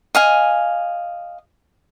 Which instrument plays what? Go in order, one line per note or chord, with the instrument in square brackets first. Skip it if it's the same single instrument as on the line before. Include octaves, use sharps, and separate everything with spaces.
[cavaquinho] D#5 F5 G#5